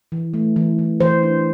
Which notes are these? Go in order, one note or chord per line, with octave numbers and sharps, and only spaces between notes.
E3
A3
E3
E3
E3 C5
D4